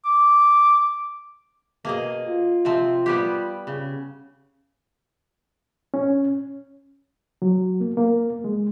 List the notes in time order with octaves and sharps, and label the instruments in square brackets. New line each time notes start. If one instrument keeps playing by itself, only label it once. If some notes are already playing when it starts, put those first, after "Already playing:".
[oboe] D6
[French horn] B2 [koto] A#3 G#4 D#5
[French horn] F4
[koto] C3 F3 C4
G3 B3 G4
C#3
[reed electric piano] C#4
F#3
A#3
A#3
G#3